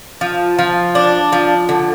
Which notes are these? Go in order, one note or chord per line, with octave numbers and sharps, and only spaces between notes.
F3
F3
D4
F3
D3